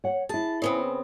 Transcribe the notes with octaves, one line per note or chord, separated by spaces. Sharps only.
C#5 F#5
E4 G#4 A5
C#3 B3 C4